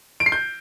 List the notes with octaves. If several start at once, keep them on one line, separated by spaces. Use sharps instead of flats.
D7
C7
G6